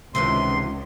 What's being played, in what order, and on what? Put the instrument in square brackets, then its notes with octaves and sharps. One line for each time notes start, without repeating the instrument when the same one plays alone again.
[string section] C#2 [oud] C3 D#3 E3 [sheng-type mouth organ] C6